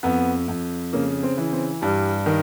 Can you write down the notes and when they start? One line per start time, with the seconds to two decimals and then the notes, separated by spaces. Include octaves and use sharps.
0.03 F2 B3
0.48 F2
0.93 C#3 A#3
1.23 C4
1.37 E3
1.52 C4
1.81 G2 G3
2.26 D#3